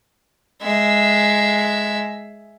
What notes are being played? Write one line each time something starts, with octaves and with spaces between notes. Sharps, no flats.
G#3 E5